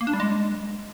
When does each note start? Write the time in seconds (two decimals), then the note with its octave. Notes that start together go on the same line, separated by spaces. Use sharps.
0.01 A#3
0.07 D4
0.13 G3
0.20 G#3